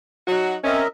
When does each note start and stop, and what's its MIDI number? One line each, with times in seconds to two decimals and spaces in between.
0.28 0.55 54
0.28 0.55 63
0.28 0.55 66
0.64 0.81 60
0.64 0.81 61
0.64 0.87 70
0.64 0.87 75
0.64 0.87 76